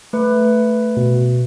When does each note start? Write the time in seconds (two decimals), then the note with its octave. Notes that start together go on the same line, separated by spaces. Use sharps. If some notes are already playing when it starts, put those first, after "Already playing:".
0.13 A3 B4
0.97 B2